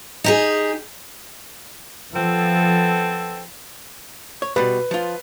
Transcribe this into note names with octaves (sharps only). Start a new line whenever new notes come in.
D#4 G4 G#4
F3 B3 C4 A4
C#5
B2 G3 B4
F3 F4